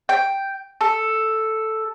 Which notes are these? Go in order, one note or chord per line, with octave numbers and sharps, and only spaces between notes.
G5
A4